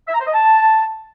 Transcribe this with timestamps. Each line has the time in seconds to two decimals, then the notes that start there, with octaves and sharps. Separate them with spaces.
0.08 E5
0.14 A#5
0.21 C5
0.27 D#5
0.34 A5